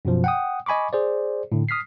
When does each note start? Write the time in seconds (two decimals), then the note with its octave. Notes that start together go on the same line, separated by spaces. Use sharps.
0.05 F#2 B2 F3
0.24 F#5 G5 D#6
0.66 D#5 G#5 B5 C#6 D6
0.93 G#4 C5 D5
1.52 A2 D3
1.69 D#6 F6 B6 C7